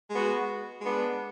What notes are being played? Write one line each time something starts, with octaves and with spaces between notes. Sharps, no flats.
G#3 B3 F#4
G#3 B3 D4